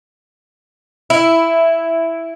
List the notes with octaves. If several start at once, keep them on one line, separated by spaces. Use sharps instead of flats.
E4